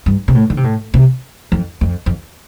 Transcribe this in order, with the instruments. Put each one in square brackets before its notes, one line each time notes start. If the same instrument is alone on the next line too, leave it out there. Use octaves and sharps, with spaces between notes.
[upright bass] G2
C3
A2
D3
C3
A2
C3
F2
F2
F2